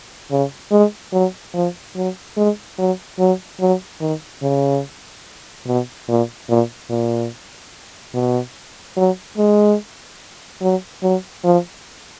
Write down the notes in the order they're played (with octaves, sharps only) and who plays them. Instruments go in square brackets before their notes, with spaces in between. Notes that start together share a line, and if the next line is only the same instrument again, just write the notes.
[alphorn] C#3
G#3
F#3
F3
F#3
G#3
F#3
F#3
F#3
D#3
C#3
B2
A#2
A#2
A#2
B2
F#3
G#3
F#3
F#3
F3